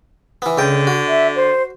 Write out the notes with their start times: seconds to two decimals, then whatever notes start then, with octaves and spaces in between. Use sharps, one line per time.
0.42 E3 B3
0.58 C#2 D3 G5
0.87 F#4
1.08 E5
1.36 C5